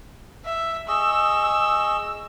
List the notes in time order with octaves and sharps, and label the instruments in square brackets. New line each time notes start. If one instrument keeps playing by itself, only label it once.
[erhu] E5
[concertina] G#4 D#5 C#6 [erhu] E6